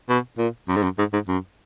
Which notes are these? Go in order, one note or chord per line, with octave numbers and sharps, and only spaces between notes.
B2
A#2
F#2
G#2
F#2
G#2
G#2
F#2